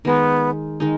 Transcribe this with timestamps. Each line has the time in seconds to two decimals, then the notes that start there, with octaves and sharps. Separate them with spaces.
0.05 D#3 G#3 B3 D#4
0.80 D#3 G#3 D#4